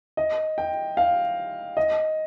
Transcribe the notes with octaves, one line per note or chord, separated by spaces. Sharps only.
D#5
G5
F5
D#5